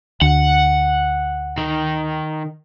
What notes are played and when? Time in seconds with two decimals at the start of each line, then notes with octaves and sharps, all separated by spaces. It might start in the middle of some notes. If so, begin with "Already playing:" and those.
0.21 D2 F#5
1.58 D#3